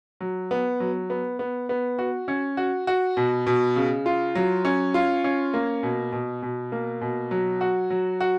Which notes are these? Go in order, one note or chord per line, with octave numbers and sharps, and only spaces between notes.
F#3
B3
F#3
B3
B3
B3
F#4
C#4
F#4
F#4
B2
B2
C#3
F4
F#3
C#4
F4
C#4
A#3
B2
B2
B2
A#3
B2
F#3
F#4
F#3
F#4